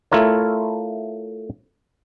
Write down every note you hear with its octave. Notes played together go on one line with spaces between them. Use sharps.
A3 E4 F4 A#4 C#5